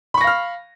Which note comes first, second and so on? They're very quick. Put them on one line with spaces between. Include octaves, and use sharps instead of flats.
B5 C#6 A#6 F5 F6